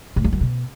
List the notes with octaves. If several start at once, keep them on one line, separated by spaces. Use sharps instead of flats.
A2
F2
F#2
B2